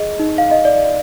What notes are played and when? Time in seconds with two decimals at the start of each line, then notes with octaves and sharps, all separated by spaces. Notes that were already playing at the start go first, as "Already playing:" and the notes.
Already playing: G#4 D#5
0.19 D#4
0.38 F5
0.51 D#5
0.65 D5